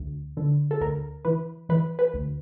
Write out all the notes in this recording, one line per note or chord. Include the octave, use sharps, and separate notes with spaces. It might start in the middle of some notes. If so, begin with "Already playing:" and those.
Already playing: D2
D3
A4
D2 A#4
E3 B4
E3 B4
B4
D2